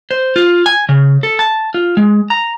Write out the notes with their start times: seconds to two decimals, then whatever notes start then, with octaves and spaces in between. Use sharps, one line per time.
0.11 C5
0.36 F4
0.66 G#5
0.89 C#3
1.23 A4
1.39 A5
1.74 F4
1.97 G#3
2.30 A#5